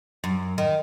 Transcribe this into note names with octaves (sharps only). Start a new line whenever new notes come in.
F#2
D#3